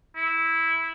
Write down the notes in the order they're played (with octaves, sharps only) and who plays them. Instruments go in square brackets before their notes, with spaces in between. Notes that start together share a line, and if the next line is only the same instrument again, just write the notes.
[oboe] E4